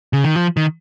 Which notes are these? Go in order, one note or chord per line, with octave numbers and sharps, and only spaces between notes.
C#3
D#3
F3
D#3